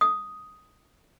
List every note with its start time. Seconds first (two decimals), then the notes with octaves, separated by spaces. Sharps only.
0.01 D#6